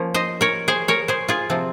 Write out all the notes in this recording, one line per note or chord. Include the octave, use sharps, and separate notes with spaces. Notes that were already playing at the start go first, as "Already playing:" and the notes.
Already playing: F3 A#3 C#4
C5 D#5
A#4 C#5
G#4 C5
A#4 C#5
G#4 C5
F4 G#4
C3 F3 C4